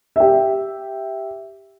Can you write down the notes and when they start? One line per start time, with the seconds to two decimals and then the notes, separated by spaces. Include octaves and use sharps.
0.16 G4 E5